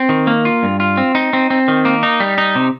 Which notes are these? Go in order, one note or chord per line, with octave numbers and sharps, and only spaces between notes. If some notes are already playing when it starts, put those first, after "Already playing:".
Already playing: C4
D#3
A#3
F4
G2
F4
C4
D#4
C4
C4
D#3
A#3
D#4
G3
D#4
C3